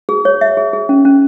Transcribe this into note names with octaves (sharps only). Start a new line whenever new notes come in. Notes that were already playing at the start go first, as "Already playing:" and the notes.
G#4
C#5
E5
G#4
G#4
C#4
C#4